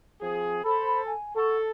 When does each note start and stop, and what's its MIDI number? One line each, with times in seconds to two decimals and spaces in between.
0.21 0.59 53
0.21 0.59 60
0.21 0.59 68
0.64 1.12 69
0.64 1.01 72
0.64 1.01 83
1.06 1.33 80
1.36 1.71 69
1.36 1.57 78
1.36 1.57 85